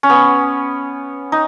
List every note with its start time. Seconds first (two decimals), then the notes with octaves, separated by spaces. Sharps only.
0.03 C#4
0.10 B3
1.32 D#4